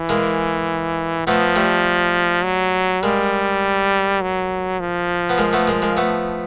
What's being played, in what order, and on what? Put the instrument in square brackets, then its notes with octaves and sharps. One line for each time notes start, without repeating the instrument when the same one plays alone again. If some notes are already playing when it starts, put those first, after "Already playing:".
Already playing: [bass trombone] E3
[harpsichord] G#3 A#3
[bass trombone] F3 [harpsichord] A3 B3
[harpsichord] G3 A3
[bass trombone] F#3
[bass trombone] G3 [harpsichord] G#3 A#3
[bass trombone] F#3
F3
[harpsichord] B3
G#3 A#3
A3 B3
G#3 A#3
G#3 A#3
A3 B3